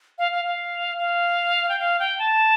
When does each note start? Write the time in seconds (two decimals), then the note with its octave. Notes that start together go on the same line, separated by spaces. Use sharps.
0.18 F5
0.32 F5
0.45 F5
0.99 F5
1.69 G5
1.79 F5
1.99 G5
2.19 A5